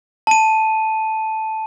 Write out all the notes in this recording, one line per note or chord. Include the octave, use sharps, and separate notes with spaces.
A5 D#7